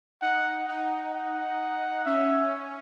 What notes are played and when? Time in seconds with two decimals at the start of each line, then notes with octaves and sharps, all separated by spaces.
0.22 D#4 F#5
0.68 D#4 F#5
1.14 F#5
2.05 C#4 E5